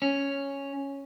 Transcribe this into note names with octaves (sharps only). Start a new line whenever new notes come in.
C#4